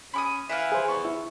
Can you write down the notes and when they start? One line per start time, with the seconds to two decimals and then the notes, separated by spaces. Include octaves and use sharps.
0.13 C#4 B5 D6 D#6
0.49 E3 E5 F5
0.72 G#4 C5
0.88 E2 C#6
1.05 E4